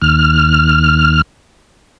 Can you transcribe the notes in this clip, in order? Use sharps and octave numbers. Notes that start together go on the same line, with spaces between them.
D#2 F6